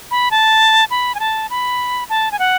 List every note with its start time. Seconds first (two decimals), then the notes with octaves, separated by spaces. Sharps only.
0.11 B5
0.31 A5
0.91 B5
1.15 G#5
1.20 A5
1.50 B5
2.10 A5
2.32 G#5
2.39 F#5